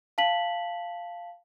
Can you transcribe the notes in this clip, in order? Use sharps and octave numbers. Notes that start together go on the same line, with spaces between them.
F5 A5 B6 F#7